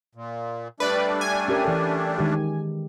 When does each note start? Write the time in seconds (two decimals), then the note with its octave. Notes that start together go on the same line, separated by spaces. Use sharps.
0.15 A#2
0.80 G3 A3 D4 B4 D5
1.21 G#5
1.48 C#4 G4 A#4
1.64 E3 A4
2.18 D#3 G#3 G4